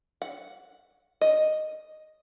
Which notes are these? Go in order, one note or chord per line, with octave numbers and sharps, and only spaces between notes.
F#5
D#5